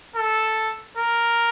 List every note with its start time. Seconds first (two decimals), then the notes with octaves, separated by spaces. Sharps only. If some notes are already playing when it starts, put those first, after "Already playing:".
0.16 A4
0.97 A#4